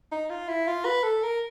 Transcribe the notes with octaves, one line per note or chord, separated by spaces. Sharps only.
D#4
F4
E4
F4
B4
A4
A#4